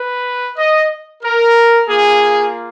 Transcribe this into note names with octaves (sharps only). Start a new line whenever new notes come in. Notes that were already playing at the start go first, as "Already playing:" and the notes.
Already playing: B4
D#5
A#4
A#3 F4 G#4